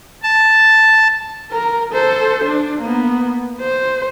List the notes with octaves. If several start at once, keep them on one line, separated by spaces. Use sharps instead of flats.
A5
A#4
A4 C5
D4
A#3 B3
C5